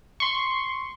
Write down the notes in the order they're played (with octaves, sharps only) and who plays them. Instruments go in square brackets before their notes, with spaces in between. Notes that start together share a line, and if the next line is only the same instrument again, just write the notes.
[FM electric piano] C6 C#6